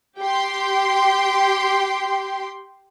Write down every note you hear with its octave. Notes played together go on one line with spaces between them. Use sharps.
G4 G5 C6